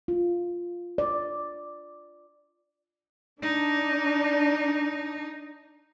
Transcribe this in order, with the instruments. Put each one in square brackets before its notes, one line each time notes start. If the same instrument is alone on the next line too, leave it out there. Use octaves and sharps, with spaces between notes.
[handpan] F4
D5
[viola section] D4 [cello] D#4